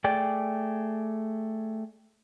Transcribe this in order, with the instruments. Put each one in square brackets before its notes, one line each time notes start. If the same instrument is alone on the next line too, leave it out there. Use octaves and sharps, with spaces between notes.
[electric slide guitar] A3 G#4 D5 G5